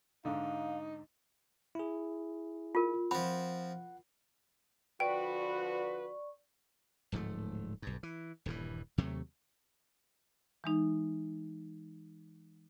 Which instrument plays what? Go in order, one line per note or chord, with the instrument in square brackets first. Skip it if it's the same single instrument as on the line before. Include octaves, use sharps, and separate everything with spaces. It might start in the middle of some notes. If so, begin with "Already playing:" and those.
[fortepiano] G#2 D3 [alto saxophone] D#4 [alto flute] F5
[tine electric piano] E4 G#4
[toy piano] F4 A#4
[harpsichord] F3 C4 [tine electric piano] F#5 [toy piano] B5
[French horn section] D3 F3 F#4 [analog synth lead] B4 [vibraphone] D5 C#6 [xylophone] G5
[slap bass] D1 G#2 F3 A3
B1 G2
E3
D#1 G2 B2 E3
D#2 C3 F#3 A3
[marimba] E3 G#3 D#4